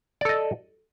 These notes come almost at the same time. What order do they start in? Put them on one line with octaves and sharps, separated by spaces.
D5 A4 D#5